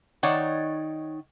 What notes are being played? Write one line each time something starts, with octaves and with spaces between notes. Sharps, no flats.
D#3 D#4 C#5 D5 F#5